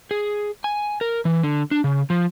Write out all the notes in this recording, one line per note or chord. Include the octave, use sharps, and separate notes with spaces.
G#4
G#5
A#4
E3
D3
D4
C#3
F3